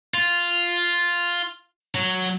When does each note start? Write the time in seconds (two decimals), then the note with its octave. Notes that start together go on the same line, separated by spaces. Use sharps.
0.14 F4
1.95 F#3